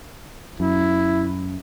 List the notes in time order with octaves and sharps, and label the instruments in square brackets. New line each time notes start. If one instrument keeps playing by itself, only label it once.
[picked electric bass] F#2 [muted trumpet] E4